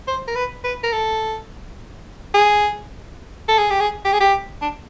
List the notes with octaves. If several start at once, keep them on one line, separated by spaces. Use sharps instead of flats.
C5
A#4
B4
B4
A#4
A4
G#4
A4
G#4
G4
G#4
G4
G#4
G4
D4